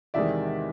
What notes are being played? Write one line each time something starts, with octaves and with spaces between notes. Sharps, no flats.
E2 C3 D#3 G#3 D5 E5